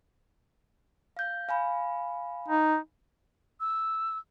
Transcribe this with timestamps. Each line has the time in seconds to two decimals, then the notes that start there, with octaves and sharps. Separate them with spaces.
1.17 F5 G6
1.49 F5 G#5 B5
2.48 D#4
3.60 E6